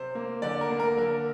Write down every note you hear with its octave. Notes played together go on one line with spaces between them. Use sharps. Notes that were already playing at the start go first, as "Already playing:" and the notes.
Already playing: C3 C5
A#3
D3 D5
A#4
A#3
A#4
D3 A#4